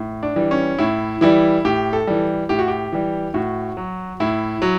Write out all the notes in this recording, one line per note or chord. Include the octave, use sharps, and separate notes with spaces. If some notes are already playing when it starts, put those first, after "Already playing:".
Already playing: A2
D4
E3 G3
C#4
A2 E4
E3 G3 E4
A2 G4
A4
E3 G3
A2 G4
F#4
G4
E3 G3
A2 F#4
F#3
A2 E4
F#3